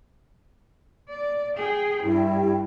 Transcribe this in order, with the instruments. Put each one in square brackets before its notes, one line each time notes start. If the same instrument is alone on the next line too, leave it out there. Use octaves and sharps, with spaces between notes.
[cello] D5
G#4 G5
[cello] G2 [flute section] E4 G4 G5